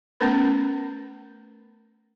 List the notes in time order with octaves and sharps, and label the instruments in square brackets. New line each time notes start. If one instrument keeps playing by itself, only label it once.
[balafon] A3 B3 C#4 A#4 B4 B5